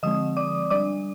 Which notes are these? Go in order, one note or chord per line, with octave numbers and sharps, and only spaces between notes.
D3 F3 G#3 C4 D#5 D#6
D5 D6
G3 D4 D5 D6